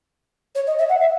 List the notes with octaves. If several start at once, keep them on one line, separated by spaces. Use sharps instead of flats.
C#5
D#5
E5
F#5
E5